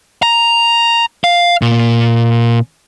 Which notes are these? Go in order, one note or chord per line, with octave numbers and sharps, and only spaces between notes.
A#5
F5
A#2